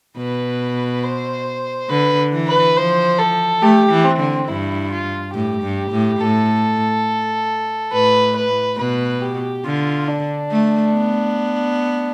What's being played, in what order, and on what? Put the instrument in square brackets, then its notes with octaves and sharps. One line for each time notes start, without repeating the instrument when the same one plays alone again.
[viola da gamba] B2 [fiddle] B4
[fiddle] C5
[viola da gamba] D3 [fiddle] B4
[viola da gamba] E3
[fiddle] B4
[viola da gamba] F3 [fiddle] C5
[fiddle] A4
[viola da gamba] A3 [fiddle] G4
[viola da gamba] E3
[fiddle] C4
[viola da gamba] D3
[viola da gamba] G2 [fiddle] E4
[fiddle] F4
[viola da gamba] A2 [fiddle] G4
[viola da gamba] G2
A2
[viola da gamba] A2 [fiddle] A4
[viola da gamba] A2 [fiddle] B4
[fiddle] B4
[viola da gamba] B2 [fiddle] B4
[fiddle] G4
[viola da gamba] D3 [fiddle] F4
[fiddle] D4
[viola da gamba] A3
B3